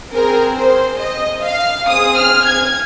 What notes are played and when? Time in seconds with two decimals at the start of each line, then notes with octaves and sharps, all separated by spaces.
0.11 C4 G#4 A#4
0.56 C5
1.00 D#5
1.44 F5
1.88 C4 G#4 D#6
2.16 F6
2.46 G#6